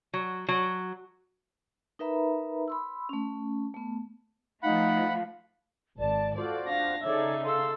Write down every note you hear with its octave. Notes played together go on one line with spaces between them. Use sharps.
F#3
F#3
D#4 A#4 B4 E5 A#5 B5
B5 C6 E6
A3 C#4
A3 B3
F3 A3 D#4 F5 F#5 B5
G#1 D5 A5
F4 F#4 A4 C5 D5
D4 F5 A#6
C#3 D#4 A4 C#5 D5 E5
A4 F5 C6 E6